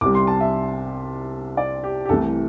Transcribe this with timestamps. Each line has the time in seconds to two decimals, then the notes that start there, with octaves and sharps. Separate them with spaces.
0.01 C2 C3 G3 D6
0.15 C6
0.27 A5
0.41 E5
1.57 D5
1.84 G4
2.05 G4
2.09 C2 C3 E3 A3 A4